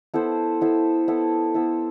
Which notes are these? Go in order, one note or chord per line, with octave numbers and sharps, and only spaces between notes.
B3 E4 A4 C5
B3 E4 A4 C5
B3 E4 A4 C5
B3 E4 A4 C5